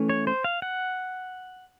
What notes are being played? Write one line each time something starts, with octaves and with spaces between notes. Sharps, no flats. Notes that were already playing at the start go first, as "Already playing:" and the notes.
Already playing: E3 A3 C#4
C#5
C5
F5
F#5